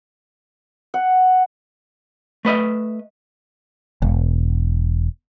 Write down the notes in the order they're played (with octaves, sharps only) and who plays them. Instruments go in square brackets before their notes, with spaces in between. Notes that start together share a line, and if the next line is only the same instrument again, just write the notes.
[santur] F#5
[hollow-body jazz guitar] A3 B4 D#5 E5
[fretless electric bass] E1